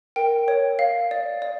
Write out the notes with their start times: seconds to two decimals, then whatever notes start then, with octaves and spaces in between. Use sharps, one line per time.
0.16 A#4 G5
0.48 C#5
0.79 F5
1.11 D5
1.42 D5